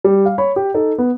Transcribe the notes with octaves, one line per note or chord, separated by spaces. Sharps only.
G3
F5
C#5 B5
G4
D#4 A4
B3